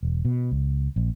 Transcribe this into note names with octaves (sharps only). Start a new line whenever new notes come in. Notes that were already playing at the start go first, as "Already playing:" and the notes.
E1
B2
C#2
A#1